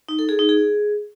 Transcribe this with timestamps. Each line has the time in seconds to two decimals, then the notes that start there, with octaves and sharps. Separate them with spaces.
0.09 D#4
0.19 A4
0.29 G#4
0.39 D#4
0.49 G#4